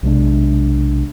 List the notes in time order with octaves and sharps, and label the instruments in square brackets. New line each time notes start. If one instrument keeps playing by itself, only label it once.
[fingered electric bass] B1 C3 G#3 D4